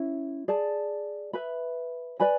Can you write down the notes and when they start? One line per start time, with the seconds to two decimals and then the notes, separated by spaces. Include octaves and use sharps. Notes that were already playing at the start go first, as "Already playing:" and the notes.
Already playing: C#4 E4
0.48 G#4 D5 A5
1.33 B4 E5 B5
2.20 B4 D5 G#5 B5